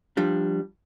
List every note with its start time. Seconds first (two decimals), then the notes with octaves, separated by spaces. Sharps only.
0.17 F3 G3 D4